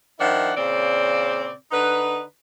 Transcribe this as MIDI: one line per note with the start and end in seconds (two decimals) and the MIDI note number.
0.20 0.52 51
0.20 0.52 53
0.20 0.52 62
0.20 0.52 64
0.20 0.52 78
0.55 1.51 46
0.55 1.51 49
0.55 1.51 60
0.55 1.51 72
0.55 1.51 74
1.71 2.21 50
1.71 2.21 63
1.71 2.21 71